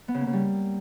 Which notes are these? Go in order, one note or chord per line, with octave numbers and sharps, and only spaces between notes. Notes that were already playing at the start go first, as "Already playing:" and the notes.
B3
C#3
A#3
C#3
G3